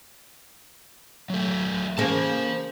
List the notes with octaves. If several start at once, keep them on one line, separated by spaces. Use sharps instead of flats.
F#3 A3
C#3 A#3 C5 A5